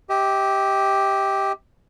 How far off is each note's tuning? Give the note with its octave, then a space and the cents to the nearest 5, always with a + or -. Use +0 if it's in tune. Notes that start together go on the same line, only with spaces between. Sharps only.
G4 +0 D#5 +45